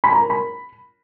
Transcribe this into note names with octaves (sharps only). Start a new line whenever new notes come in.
B5
A#5
A#4
B5